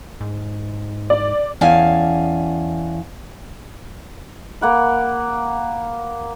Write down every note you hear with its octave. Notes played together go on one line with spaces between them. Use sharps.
G#2
D5
E2 C#4 D5 F5 G#5 A5
A#3 F#5 B5